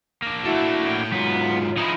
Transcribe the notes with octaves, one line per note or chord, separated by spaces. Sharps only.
A#3 D4
E4 F#4 A4 E5
A2 G5
G#2 F#3 B3 F4
F3 D#4 E4 G#4